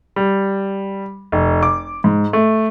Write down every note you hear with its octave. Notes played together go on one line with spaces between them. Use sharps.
G3
F1
D6
G#2
A3